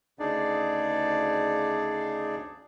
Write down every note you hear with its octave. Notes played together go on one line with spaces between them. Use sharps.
D2 C#3 D4 D#4 G#4 D5